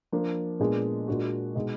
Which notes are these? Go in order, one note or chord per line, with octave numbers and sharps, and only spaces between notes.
F3 A#3 D4
A#2 G#3 B3 D4 G#4
A#2 G#3 D4 F#4
B2 G#3 B3 D#4